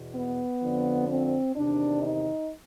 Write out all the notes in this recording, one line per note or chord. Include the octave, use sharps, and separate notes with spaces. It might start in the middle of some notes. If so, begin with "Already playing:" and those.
Already playing: E2 B2
B3
F2 D3 F3
C4
E2 C3 D#3 D4
D#4